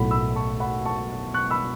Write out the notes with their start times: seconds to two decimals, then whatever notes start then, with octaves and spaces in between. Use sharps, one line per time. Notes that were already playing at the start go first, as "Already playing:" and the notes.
Already playing: B1 A2 A3 F#5 B5
0.11 B5 E6
0.36 A5 C#6
0.60 F#5 B5
0.85 A5 C#6
1.34 C#6 F#6
1.50 B5 E6